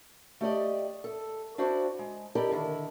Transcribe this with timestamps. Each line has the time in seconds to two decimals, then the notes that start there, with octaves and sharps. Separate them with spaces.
0.41 A3 G4 D5 D#5
1.04 A4
1.58 D4 E4 F#4 C5 D5
1.99 G#3
2.35 E4 G4 A4 A#4 D5 D#5
2.51 D3 D#3 E4